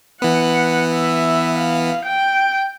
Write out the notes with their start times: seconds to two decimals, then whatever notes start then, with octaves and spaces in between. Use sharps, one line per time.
0.22 E3 B3 F#5
0.93 E5
1.58 F5
2.05 G5